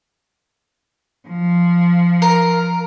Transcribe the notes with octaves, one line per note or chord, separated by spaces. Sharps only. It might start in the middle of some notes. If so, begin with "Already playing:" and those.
F3
A#4